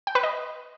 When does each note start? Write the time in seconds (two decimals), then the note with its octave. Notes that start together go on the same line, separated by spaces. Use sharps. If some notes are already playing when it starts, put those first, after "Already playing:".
0.07 G5
0.15 B4
0.23 D#5